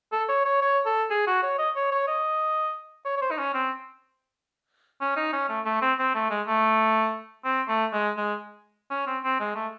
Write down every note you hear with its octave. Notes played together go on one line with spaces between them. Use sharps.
A4
C#5
C#5
C#5
A4
G#4
F#4
C#5
D#5
C#5
C#5
D#5
C#5
C#5
C5
D#4
C#4
C4
C#4
D#4
C#4
A3
A3
C4
C4
A3
G#3
A3
C4
A3
G#3
G#3
C#4
C4
C4
G#3
A3